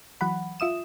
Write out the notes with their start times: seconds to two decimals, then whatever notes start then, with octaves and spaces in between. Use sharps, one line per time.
0.21 E3 F#3 F#5 B5
0.60 F4 E5 D#6 E7